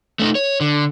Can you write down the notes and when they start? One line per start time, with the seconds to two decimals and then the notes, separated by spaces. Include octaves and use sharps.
0.19 A3 C#4 D#4
0.35 C#5
0.61 D3